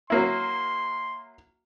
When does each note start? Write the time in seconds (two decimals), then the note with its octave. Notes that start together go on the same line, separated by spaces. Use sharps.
0.10 F#3 A#3 E4 C6